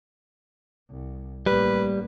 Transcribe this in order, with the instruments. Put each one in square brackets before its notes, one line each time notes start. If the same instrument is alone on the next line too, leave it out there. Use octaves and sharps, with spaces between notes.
[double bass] C2
[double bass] A1 A#3 [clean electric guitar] G3 [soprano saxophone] B4